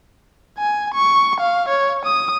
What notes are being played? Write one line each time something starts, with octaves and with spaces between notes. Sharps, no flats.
G#5
C#6
F5
C#5
D#6